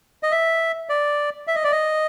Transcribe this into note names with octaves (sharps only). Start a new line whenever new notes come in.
D#5
E5
D5
E5
D#5
D5
D#5